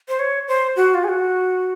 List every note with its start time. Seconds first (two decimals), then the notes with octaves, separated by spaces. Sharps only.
0.09 C5
0.19 C#5
0.48 C5
0.76 F#4
0.94 F4
1.04 G#4
1.09 F#4